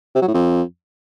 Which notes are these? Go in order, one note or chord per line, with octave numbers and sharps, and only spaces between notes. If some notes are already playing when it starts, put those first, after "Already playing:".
C3
F#3
A2
F2